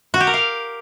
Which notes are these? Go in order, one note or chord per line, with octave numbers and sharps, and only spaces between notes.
F#4
G4
A#4
F5